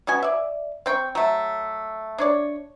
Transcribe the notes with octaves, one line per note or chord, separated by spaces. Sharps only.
B2 C#4 F#4 G#5
D5 E5
C4 G5 C6 C#6
F#3 A3
D4 C#5 D5